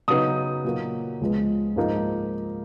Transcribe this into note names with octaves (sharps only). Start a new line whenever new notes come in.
C#3 F#3 B3 D#4 D#6
A#2 F#3 A#3
C#2 C#3 F3 G#3 B3
G#2 F3 A#3 D#4